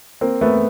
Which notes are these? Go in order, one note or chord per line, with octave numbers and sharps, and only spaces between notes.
A#3 C4
A3 B3